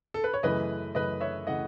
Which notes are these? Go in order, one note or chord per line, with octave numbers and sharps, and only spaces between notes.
A4
B4
C#5
F#2 C#3 E3 A3 B4 D#5
F#2 C#3 E3 A3 B4 D#5
C#5 E5
C#3 E3 A3 D#5 F#5